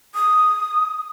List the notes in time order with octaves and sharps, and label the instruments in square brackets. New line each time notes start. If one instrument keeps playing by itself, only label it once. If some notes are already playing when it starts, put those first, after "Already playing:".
[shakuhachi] D#6